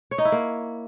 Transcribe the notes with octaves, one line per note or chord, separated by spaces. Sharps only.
C#5
D#4
E4
A#3